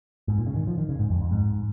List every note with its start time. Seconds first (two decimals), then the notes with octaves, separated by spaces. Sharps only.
0.28 G#2
0.38 A#2
0.47 C#3
0.56 D#3
0.67 F3
0.78 D#3
0.89 C#3
0.99 G#2
1.10 F2
1.20 F2
1.31 G#2